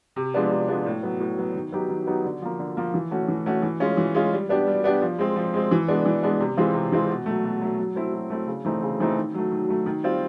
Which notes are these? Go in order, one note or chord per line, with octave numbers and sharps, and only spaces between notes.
C3
F3 G#3 B3 D4
C3
F3 G#3 B3 D4
A2
F#3 B3
A2
F#3 B3
D#3
F#3 B3 D#4 G4
D#3
F#3 B3 D#4 G4
D3
F3 A#3
D3
F3 A#3
E3
A3 C#4 F#4
E3
A3 C#4 F#4
E3
G#3 C#4 F4
E3
G#3 C#4 F4
G3
B3 D4 G4
G3
B3 D4 G4
F3
G#3 C4
F3
G#3 C4
E3
G#3 B3 D4
E3
G#3 B3 D4
C3
E3 G#3 C4 F4
C3
E3 G#3 C4 F4
B2
F#3 A3
B2
F#3 A3
F#3
A3 C4 E4
F#3
A3 C4 E4
C#3
E3 A3 C4 D#4
C#3
E3 A3 C4 D#4
D#3
F#3 A3
D#3
F#3 A3
D#3
G3 C4 F4